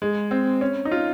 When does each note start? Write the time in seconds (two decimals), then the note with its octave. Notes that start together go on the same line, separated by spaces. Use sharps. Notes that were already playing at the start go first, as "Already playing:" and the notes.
0.02 G#3
0.31 C4
0.61 C#4
0.85 D#4
0.91 F4